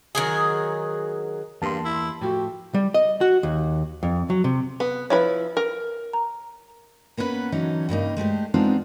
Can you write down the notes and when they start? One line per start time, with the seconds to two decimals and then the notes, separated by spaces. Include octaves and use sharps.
0.15 D#3 F#3 G#4
1.62 E2 G2 A#3 A5 C6
1.85 E4
2.22 A2 F3 A3 F#4 G4
2.74 G3
2.94 D#5
3.21 F#4
3.43 D#2
4.03 F2
4.30 F#3
4.44 C3
4.80 B3
5.10 F3 E4 B4 C#5 B5
5.57 A#4
6.13 A#5
7.17 A#3 B3 C#4 E4 B4
7.52 D3 E3 F#3 C#4 D#4
7.89 G2 C#3 A#3 D#4
8.17 G#3 A3 G4 C5
8.54 G#3 B3 C4 D4 D#4 F4